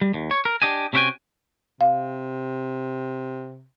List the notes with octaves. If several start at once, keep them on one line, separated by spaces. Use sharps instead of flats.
G3
D#2
C#5
A#4
D4 G4 D#5 G#5
C3 C#4 E4 F#4 G5 G#5
C3 F5